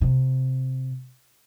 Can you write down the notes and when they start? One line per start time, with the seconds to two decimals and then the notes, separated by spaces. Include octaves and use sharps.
0.01 C3